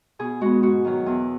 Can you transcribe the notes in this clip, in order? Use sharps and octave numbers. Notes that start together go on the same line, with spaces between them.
B2 G#4
G#3 B3 F#4
G#2 F#4
D#3 F#3
E2